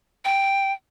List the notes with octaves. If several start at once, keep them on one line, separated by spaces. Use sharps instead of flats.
G5